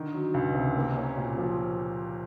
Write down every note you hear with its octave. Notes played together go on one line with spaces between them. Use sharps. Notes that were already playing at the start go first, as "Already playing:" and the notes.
Already playing: D3 D#3
F#3
C#2
C3
A#3
C#4
A#2
F3